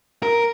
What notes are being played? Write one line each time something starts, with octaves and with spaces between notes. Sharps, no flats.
A#4